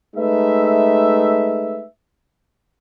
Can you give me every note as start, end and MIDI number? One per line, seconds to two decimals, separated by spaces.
0.16 1.85 56
0.16 1.85 57
0.16 1.85 63
0.16 1.85 71
0.16 1.85 76